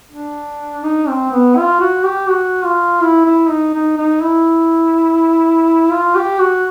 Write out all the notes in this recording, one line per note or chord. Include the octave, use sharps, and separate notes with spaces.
D4
D#4
C4
B3
F4
F#4
G4
F#4
F4
E4
E4
D#4
D#4
D#4
E4
F4
G4
F#4